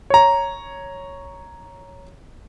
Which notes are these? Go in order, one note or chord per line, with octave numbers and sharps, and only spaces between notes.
C#5 A#5